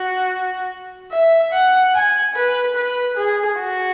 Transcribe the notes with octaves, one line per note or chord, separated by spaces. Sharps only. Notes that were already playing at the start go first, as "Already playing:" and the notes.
Already playing: F#4
E5
F#5
G#5
B4
B4
G#4
F#4